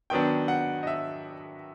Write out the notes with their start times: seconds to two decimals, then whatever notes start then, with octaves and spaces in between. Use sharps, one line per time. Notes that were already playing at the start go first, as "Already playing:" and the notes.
0.10 D#3 F#3 B3 D4 G5
0.48 F#5
0.83 D#5
0.87 E5